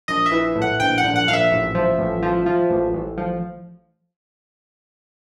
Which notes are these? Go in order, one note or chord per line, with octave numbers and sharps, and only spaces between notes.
A#1 D#5
E5
E3
A2
F#5
A#1 G5
F#5
A#1
F#5
A#1 F5
E5
A1
F3
A1
F3
F3
A1
A1
F3